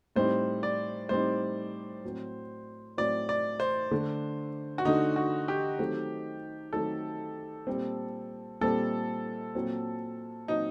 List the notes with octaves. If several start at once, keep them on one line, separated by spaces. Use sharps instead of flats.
A2 G3 C4 D#4 C5
D5
A2 G3 C4 D#4 C5
A2 F#3 C4
A2 F#3 C4 D5
D5
C5
D3 A3 D4
F#4
D3 A3 D4 D#4
F#4
G4
D#3 F#3 A3 C4
D#3 F#3 A3 C4 A4
A#2 G3 C4
A#2 G3 C4 A4
A#2 F#3 C4
A#2 F#3 C4 D#4